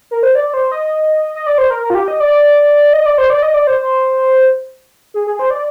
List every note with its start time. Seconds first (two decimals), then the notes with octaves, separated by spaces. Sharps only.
0.11 A#4
0.23 C5
0.35 D5
0.54 C5
0.72 D#5
1.35 D#5
1.46 D5
1.58 C5
1.70 A#4
1.83 A#4
1.90 F4
1.95 G4
2.08 D#5
2.20 D5
2.93 D#5
3.06 D5
3.18 C5
3.30 D5
3.43 D#5
3.54 D5
3.67 C5
5.14 G#4
5.27 G#4
5.39 C5
5.50 D5